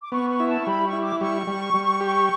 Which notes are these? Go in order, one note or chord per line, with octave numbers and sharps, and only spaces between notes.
D6
B3 C#6
C#6
E4
A5
C#6
G3 B5
C#6
E4
D6
G3 C#6
G3
G3
G4